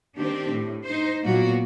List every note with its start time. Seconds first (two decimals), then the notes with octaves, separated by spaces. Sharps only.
0.17 D#3 C4 D4 G4
0.48 A2
0.85 D#4 C5
1.23 A#2 F#3 A#3 B3 F#4